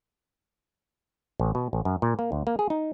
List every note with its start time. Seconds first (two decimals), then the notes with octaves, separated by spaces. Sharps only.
1.40 A1
1.55 B2
1.73 A1
1.85 F#2
2.02 A#2
2.19 A#3
2.32 D2
2.47 A#3
2.59 G#4
2.70 D#4